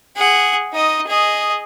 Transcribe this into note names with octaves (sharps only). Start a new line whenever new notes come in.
G#4 F#5
D#4 D#5
G#4 D#5